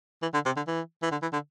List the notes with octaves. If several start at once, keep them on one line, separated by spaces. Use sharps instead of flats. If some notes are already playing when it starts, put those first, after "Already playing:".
E3
D3
C3
D3
E3
E3
D3
E3
D3